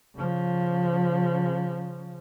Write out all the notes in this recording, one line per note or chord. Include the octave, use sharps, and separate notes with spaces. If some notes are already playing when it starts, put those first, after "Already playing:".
C#3 F3